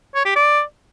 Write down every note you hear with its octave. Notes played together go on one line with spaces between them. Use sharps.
C#5
G4
D5